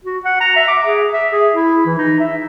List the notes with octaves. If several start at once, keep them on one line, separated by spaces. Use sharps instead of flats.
F#4
F#5
A#5
E5
D6
G#4
E5
G#4
E4
E3
D#4
E5